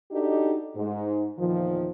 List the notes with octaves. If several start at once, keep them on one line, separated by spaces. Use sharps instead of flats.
D4 D#4 F#4 G4 A4 D#5
G#2
E2 A#2 D#3 F3